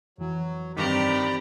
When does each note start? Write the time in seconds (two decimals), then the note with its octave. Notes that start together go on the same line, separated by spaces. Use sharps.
0.18 F2 E3 F#3
0.76 G2 D#3 C4 G4 D5 A#5 B5